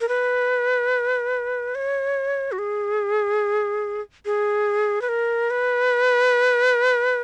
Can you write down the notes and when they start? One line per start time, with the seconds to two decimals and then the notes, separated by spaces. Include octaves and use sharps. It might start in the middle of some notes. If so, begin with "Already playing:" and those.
0.01 A#4
0.09 B4
1.75 C#5
2.52 F#4
2.59 G#4
4.25 G#4
5.02 B4
5.09 A#4
5.50 B4